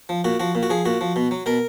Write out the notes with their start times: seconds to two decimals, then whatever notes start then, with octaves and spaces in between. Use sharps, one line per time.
0.09 F3
0.24 A#2 F#4
0.40 F3 F#4
0.55 A#2
0.63 F#4
0.70 F3 G#4
0.85 A#2 F#4
1.01 F3
1.16 B2
1.31 F#3
1.46 B2 A#4